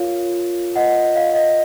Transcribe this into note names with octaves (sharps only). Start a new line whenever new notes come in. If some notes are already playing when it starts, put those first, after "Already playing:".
Already playing: F4 A#4 C#5 F5
D#5 F#5
F5
D#5